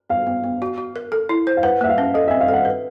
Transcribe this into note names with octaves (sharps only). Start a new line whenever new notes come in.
B3 F5
B3
B3
F#4
F#4
A#4
A4
E4
C5
F5
B4 F#5
A#3 E5
F5
C#4
A4 D#5
C4 E5
F5
A4 F#5
B4